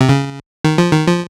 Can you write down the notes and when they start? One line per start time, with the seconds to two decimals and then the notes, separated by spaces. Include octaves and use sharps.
0.01 C3
0.09 C#3
0.64 D#3
0.78 F3
0.92 D#3
1.07 F3